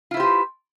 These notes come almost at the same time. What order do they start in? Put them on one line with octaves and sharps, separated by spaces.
F4 E4 C5 G4 B4